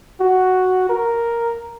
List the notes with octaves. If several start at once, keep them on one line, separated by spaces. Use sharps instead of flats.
F#4
A#4